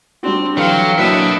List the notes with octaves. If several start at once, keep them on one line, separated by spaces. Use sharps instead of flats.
G3 C4 D4 F#4
D3 E3 F#3 F5 G5
F#3 A#3 D4 E4 B4 D#5 E5